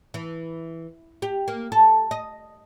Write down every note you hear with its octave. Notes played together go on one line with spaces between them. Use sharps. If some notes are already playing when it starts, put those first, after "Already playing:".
E3
G4
A#3
A4
D#5